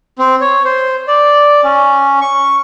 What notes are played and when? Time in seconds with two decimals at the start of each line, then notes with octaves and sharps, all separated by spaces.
0.19 C4
0.41 C#5
0.65 C5
1.07 D5
1.64 C#4
2.21 C#6